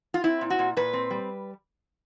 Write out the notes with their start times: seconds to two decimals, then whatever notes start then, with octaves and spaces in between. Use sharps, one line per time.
0.14 F4
0.24 C4 E4
0.41 A#2
0.50 F#4
0.59 A#2
0.77 A#2 B4
0.93 C4
1.11 G3